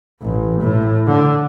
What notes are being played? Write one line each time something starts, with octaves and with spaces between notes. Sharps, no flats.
A1
A2
D3